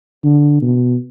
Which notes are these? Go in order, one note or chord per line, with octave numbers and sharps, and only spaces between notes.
D3
B2